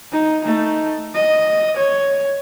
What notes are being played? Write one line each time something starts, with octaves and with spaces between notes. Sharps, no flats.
D#4
A3 D#4
D#5
C#5